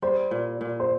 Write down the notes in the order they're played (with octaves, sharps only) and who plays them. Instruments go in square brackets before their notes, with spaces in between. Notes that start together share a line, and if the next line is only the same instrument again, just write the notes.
[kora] G3 [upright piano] C5
[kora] A#2
A#2
[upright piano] C5